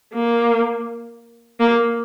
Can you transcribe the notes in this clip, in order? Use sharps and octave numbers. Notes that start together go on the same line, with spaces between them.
A#3
A#3